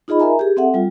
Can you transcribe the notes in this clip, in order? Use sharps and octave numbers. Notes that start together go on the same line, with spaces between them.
D#4 F4 G#4 D#5 B5
A#4 E5 G#5 A#5
G4 G#4
C4 A4 E5 F#5
G3 F4